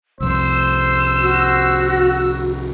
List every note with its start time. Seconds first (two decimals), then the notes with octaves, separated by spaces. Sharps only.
0.20 C2 F2 C5 E6
1.21 F#4